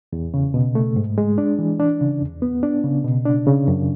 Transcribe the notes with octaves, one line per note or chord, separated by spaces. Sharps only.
E2
C#3
B2
A3
G#2
G#3
D4
E3
D4
C#3
E2
B3
D4
C#3
B2
D4
C#3
F#2